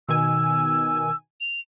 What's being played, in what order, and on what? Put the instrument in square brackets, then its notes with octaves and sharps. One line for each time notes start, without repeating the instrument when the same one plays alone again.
[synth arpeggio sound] B2 D#3 G#5 [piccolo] E6
[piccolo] F7